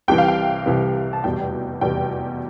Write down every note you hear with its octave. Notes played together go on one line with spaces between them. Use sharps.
C2 C3 E3 G5
F5
G5
C2 C3 E3
A5
F1 E2 B2 G3 G5
F1 E2 B2 G3 G5